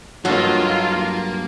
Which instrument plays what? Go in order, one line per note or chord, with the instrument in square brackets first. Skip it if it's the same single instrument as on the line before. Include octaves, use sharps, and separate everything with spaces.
[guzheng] G2 A4 D#5 [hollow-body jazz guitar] F#3 F#4 [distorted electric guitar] A#3 [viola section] F4